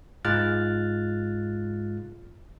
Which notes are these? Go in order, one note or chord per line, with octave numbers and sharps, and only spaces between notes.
G#2 G#3 F4 F6 F#6 A6